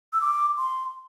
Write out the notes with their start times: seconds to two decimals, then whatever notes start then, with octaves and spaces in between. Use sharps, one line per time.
0.13 E6
0.21 D6
0.58 C6